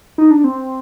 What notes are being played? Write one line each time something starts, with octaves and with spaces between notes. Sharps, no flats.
D#4
D4
C4